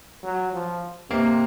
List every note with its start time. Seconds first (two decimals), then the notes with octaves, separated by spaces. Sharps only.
0.23 F#3
0.53 F3
1.10 C3 A#3